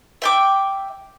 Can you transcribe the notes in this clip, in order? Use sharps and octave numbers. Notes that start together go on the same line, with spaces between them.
E5 G5 D6